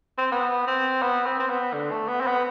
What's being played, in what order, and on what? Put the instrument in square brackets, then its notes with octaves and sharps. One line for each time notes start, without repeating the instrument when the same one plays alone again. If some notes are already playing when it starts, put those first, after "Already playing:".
[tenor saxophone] C4
B3
C4
B3
C4
C4
B3
D3
A3
B3
C4
B3